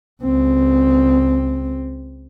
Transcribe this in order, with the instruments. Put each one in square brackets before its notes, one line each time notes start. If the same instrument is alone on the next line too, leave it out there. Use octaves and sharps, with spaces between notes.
[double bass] C#2 C4